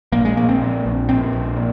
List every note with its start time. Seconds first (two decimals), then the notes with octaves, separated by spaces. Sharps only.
0.12 A#1 A#3
0.25 G#3
0.37 A#1 A#3
0.49 C4
0.61 A#2
0.86 A#1
1.09 A#2 C4
1.33 A#1
1.57 A#2